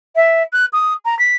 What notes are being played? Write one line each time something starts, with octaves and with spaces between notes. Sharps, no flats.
E5
F#6
D#6
A#5
B6